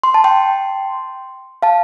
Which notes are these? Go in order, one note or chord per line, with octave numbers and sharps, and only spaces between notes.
C6
A5
G5 C6
F5 A5